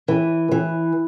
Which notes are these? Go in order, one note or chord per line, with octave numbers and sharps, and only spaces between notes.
E3
E3